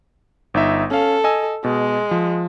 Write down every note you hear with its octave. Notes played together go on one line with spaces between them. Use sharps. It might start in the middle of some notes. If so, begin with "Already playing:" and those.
G1 D#4 E5
C#4 A4 F5
D#5 G#5 E6
B2 G#3
F3